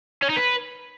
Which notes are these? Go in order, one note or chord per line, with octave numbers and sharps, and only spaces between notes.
C#4
D#4
B4